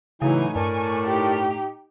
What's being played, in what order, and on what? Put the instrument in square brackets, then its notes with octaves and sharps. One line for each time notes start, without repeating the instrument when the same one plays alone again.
[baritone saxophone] A2 [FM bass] C#3 [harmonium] E3 F#3 E4 [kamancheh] D#4 G#5
[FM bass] G2 [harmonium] A#4 D5 A5 [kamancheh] G#5 C#6
[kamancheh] D#4 G4